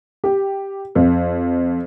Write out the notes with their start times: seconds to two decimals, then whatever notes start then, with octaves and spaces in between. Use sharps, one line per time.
0.24 G4
0.95 F2